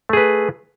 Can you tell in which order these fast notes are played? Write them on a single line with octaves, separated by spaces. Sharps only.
A3 G#4 B4